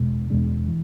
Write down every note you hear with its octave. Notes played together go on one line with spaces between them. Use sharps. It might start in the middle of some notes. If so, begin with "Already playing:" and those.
Already playing: E2 B2 G#3 D4
E2 B2 G#3 D4
E3